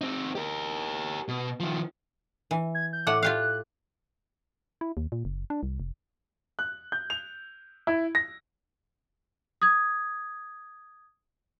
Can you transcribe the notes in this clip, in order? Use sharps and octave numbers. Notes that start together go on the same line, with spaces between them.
C4 D#4
G4 A#4
B2
D#3 F3
E3
G#6
G6
A2 A3 F#5 D6
F4 G4 F5 F#6
E4
D#2
A#2
F#1
D4
C2
F1
F#6
G6
F7
E4
A#6
D#6 G#6